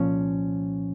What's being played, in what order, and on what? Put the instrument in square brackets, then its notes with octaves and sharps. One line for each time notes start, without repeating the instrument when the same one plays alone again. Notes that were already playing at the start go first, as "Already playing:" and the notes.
Already playing: [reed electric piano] C2 A#2 F3 C#4